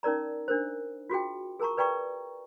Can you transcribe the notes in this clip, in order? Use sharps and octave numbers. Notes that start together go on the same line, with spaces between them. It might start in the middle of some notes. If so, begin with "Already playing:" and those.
C#4 D#4 A#4 D5 A#5
D4 A#4 C5
F4 F#4 G#4 G5
G#4 A#4 A5 A#5 C#6
B4 D5 G5 A#5 C#6